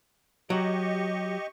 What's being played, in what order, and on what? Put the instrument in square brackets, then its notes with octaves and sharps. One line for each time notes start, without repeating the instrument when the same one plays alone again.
[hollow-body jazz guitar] F#3 [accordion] G4 D#5 C#6